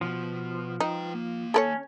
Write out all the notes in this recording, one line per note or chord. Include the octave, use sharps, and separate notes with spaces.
B2 F3
D#4 B4 G5
D#2 A#3
C#4 A4 A#4 C#5